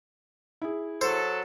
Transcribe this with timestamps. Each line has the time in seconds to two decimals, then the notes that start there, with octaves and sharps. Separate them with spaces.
0.62 E4 G#4
1.01 F#3 A4 C5